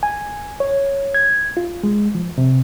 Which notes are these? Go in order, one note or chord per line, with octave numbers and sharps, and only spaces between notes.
G#5
C#5
G#6
F4
G#3
F3
C3